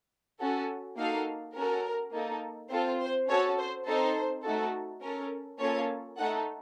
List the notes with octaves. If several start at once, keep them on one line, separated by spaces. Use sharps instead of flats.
C#4 F#4 A4
A#3 D#4 F#4 A4 F5
C#4 F#4 A4 A#4
A#3 D#4 A4
C4 F4 A4 C5
C5
C#4 F#4 A4 C#5
C5
C4 D#4 A4 C5
A3 D#4 F#4 A4
C#4 A4 A#4
A#3 C#4 F4 A4 C#5
A3 D#4 A4 F#5